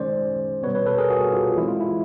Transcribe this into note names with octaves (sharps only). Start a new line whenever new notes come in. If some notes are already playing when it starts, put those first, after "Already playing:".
Already playing: D#3 G#3 C#4 C5 D5
B2 G3 B3 B4 C#5
B4 C#5
A4 B4
G#4 A#4
F#4 G#4
F4 G4
E3 G#3 C4 E4
F4
E4